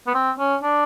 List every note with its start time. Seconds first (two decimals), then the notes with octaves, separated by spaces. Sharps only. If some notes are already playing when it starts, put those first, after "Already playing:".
0.07 B3
0.15 C4
0.39 C#4
0.63 D4